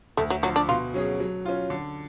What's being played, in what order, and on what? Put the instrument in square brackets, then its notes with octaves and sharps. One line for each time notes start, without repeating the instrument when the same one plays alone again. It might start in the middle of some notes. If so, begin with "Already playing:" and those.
[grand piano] D2 [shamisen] A3
[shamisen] F#3
[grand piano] D3 F3 [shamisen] F#3
[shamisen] D4
[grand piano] B2 [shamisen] F4
[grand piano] F#3 C#4 G#4
F#3
C#4 F4
D3